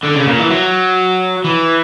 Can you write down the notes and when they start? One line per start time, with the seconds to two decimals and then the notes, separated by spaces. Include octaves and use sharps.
0.03 D3
0.16 C#3
0.27 A#2
0.39 E3
0.50 F#3
1.44 E3